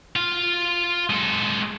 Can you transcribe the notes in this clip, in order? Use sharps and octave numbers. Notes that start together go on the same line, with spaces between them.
F4 F5
G#3 A4